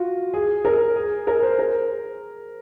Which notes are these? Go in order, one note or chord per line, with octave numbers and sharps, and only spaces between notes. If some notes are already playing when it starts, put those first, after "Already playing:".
Already playing: F4 F#4
G#4
A#4
G#4
A#4
C5
A#4